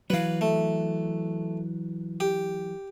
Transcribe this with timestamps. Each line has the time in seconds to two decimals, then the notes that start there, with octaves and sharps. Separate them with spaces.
0.10 E3 F#3 B4 F5
0.41 A3
2.20 G4